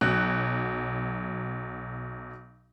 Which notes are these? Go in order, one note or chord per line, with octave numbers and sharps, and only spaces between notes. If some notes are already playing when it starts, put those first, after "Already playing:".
B1 F#3 F#6